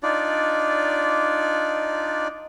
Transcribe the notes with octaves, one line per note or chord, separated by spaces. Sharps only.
D4 D#4 F4 D5